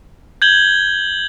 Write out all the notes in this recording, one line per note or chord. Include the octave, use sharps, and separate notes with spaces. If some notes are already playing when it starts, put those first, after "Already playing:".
G6 G#6 F#7 G7